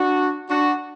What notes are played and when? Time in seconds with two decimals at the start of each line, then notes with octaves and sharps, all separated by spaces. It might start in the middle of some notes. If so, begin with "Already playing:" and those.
Already playing: D4 F#4
0.50 D4 F#4